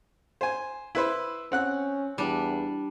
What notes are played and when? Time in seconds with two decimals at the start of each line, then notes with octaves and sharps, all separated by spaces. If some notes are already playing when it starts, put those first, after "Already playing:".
0.41 C5 G#5
0.95 E4 B4 C5
1.52 C4 C#4 F#5 F#6
2.18 E2 G3 D4